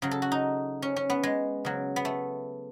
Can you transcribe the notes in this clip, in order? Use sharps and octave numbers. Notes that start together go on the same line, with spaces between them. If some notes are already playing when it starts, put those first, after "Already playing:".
C#3 F#3
A4
F#4
D#4
C#4
C#4
B3
G#3
C#3 F#3
B3
A3